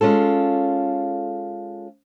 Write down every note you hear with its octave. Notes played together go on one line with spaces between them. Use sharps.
G#3 C#4 F4 A4